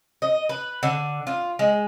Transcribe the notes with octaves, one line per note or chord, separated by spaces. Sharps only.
D#5
B4
D3
F4
G#3